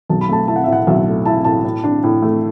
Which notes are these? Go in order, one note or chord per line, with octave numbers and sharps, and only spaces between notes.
B1 A5
B5
A3 A5
E4 A5
F#5
E5
A2
F#5
B1 E5
A3
E4 A5
A2 A5
A2
D4
A2
A3